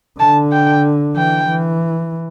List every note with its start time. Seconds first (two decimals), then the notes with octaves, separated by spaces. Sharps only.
0.20 D3 A5
0.52 G5
1.16 E3 G5
1.48 E3